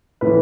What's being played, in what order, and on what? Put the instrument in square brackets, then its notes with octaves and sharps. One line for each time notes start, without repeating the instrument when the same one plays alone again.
[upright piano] A2 E3 B4